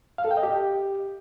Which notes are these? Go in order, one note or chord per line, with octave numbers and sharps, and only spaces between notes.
F5
A4
G5
D#5
G4